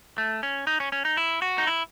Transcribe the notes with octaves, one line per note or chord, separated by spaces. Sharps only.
A3
C#4
D#4
C#4
C#4
D#4
E4
F#4
D#4
E4